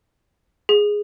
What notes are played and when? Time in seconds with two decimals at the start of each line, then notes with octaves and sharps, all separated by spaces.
0.69 G#4